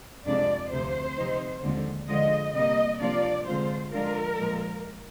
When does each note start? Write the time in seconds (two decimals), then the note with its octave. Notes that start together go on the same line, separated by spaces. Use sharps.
0.25 F2 C3 F3 G#3 D4 D5
0.72 D2 C3 F3 C5
1.17 C3 F3 C4 D#4
1.63 D#2 D3 F3 G#3 C4
2.09 D3 F3 G#3 D#5
2.54 C3 G3 A#3 D#5
3.00 C3 F3 A#3 D4 F4 D5
3.46 D3 G#3 C4 F4 C5
3.92 D3 F3 G#3 D4 F4 A#4
4.38 A#2 F3 G#3